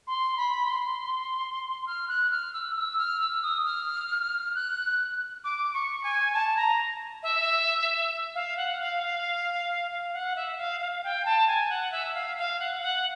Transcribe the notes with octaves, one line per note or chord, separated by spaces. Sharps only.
C6
B5
C6
F6
F#6
F6
E6
E6
F6
E6
D#6
F6
F#6
D6
C#6
G#5
A5
A#5
E5
F5
F#5
F5
F5
F#5
E5
F5
F5
G5
A5
G#5
F#5
E5
F5
F5
F#5
F#5